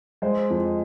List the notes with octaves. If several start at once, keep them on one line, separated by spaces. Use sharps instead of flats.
G#3 C5 D#5
F2